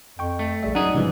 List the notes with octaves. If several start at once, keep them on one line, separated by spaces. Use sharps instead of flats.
F2 G5 C#6
A3
A#1 G3 G#4 E5
F#2 D#4 G#4 D5 F#5
C#2 G#2 C3 E3 F3 G3